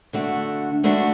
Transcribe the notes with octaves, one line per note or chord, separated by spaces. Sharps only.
D3 A3 D4 F#4
D3 A3 D4 F#4